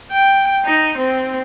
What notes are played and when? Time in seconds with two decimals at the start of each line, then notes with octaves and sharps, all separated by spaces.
0.11 G5
0.65 D#4
0.97 C4